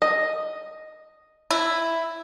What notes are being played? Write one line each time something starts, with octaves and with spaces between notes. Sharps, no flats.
D#5
E4